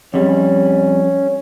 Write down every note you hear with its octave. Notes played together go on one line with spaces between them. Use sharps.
F2 G3 C#4